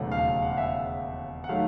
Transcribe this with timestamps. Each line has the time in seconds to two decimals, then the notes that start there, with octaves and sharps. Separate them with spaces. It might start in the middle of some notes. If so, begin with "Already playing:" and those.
Already playing: E1 D#2 C#3 F#3 A3 F#5
0.11 F5
0.43 F#5
0.50 F5
0.57 E5
1.44 F#5
1.49 D#3 F#3 A3 F5